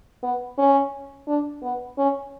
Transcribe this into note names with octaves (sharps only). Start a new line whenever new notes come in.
B3
C#4
D4
B3
C#4